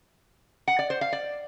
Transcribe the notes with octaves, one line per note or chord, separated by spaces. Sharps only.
F#5
D5
C5
F5
D5